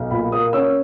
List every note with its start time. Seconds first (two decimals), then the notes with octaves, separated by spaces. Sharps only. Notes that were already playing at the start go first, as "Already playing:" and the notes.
Already playing: B1
0.11 A#2 B5
0.32 A#3 D#6
0.53 C#4 E6